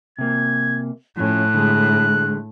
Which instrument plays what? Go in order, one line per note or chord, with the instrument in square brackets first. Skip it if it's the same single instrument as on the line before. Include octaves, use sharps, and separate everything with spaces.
[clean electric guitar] C3 A#3 [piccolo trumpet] G#6
[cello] A2 [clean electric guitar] F3 C#4 [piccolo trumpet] F#6
[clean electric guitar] D3 G#3